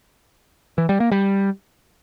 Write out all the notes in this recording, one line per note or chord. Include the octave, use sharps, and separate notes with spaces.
E3
G3
A#3
G3